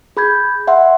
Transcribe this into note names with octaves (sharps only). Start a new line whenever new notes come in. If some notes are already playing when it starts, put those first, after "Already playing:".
G#4 B5 G6 G#6
E5 F#5 C6